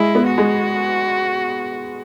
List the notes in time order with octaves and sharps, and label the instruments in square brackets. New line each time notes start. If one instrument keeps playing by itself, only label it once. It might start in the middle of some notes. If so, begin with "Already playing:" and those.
Already playing: [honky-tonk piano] G#3 [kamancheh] E4
[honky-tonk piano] B3
[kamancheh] F#4
[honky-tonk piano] G#3